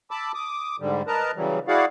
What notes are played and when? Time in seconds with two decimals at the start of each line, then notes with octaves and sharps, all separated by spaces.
0.11 A5 B5 D6 E6
0.34 D6 D#6
0.80 G#2 D3 G3
1.07 A#4 B4 D#5 A5 A#5
1.36 C#3 E3 F#3 G3
1.68 E4 F#4 G#4 D5 F5 F#5